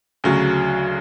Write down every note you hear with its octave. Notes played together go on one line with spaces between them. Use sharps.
D2 C#3 F#3